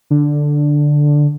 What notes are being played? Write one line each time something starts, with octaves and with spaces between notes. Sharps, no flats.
D3